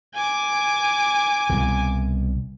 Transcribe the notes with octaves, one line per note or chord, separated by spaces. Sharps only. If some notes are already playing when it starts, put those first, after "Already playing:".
G#5 D6
C2 B2